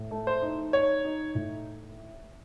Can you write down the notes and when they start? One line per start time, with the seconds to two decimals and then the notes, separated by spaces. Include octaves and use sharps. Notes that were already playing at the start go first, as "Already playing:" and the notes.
Already playing: A2
0.11 A3
0.27 C5
0.42 D#4
0.73 D#4 C#5
1.05 D#4
1.35 A2